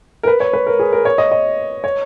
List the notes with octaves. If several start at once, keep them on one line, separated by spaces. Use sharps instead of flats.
A#4
B4
C#5
B4
A#4
G#4
A#4
C#5
D#5
D#5
C#5